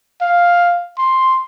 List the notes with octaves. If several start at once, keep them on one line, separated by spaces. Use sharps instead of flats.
F5
C6